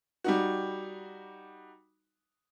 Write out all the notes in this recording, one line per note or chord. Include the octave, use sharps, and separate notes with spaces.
G3 D#4 F#4